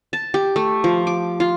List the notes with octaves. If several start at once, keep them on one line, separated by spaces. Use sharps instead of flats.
A5
G4
A3
F3
D6
F4